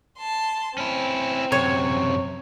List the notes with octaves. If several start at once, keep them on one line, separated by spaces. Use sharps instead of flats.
A5 C6
C4 C#4 E4
F#2 C3 C#5